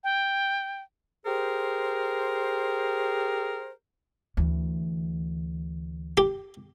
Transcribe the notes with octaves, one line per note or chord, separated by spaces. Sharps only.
G5
G4 G#4 A#4 C5
D2 E3
G4